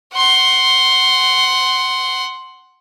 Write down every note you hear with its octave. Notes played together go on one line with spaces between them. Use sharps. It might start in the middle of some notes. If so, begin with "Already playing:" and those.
F#5 C6